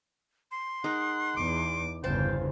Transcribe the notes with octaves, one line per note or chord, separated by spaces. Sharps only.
C6
G#3 D#4 A#4 F#5
E2 D6
G1 E2 C#3 C5 F5 G5 A5